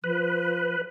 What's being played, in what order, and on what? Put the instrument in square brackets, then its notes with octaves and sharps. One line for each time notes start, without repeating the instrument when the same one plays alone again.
[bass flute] F3 [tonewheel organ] B4